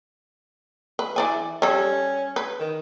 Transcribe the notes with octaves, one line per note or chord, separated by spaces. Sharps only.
B4
E3 D5 G#5
G3 C#4 A4
B4
D#3